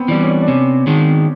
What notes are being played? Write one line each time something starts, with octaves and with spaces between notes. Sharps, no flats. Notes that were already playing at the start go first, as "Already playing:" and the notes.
Already playing: B3 C4
E3 G3 D4
C#4
D4
D4
C3 C#4
D#3 G#3